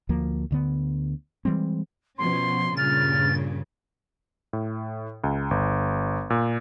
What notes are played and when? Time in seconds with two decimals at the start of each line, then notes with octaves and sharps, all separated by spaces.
0.09 D2 F3 A#3
0.51 D2 D3 B3
1.45 E3 G3 G#3 C4
2.18 B2 F3 C#4 C6
2.77 G2 A#2 C#3 F6 A6
4.53 A2
5.24 C#2
5.51 G1
6.30 A#2